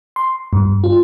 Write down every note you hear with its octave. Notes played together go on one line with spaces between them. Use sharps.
C6
G2
F4